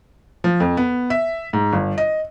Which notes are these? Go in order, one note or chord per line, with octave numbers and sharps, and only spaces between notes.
F3
F2
B3
E5
G#2
G1
D#5